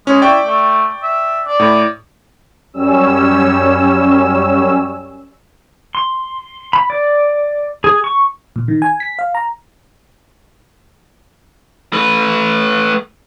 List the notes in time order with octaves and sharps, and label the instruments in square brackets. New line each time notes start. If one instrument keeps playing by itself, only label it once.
[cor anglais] G#3 [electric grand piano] C#4
[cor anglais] E4 [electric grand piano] D5 G5 C#6
[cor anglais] A3
E5
D5
[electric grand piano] A2 B5
[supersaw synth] F#2 G3 C#4 E6
[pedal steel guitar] C6
B5
D5
G#4
C#6
[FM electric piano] A#2
D#3
G#5
B6
F5
A#5
[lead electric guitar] A3 B4